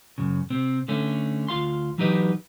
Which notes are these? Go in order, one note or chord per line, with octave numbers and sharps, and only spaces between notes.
F#2 C#3
C3 C4
D3 A3 C#4
D2 F4 F5 C6
E3 F#3 D#4 G4 B4 D#5